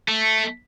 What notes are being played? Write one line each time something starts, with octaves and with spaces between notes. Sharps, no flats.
A3